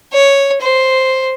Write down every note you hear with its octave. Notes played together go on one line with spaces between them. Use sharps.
C#5
C5